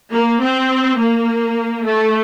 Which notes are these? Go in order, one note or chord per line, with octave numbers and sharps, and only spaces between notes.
A#3
C4
A#3
A3